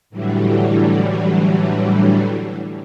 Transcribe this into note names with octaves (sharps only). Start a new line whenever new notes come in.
A2 D3 E3 F#3 G3